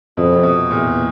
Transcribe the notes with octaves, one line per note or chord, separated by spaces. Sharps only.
F2 B2
C3
B2
E2 A#2